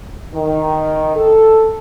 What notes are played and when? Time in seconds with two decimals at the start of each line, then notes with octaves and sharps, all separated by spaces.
0.34 D#3
1.15 A4